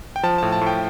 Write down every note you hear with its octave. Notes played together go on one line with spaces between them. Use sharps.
G5
F3 A5
A2 A5
A5
A2
G5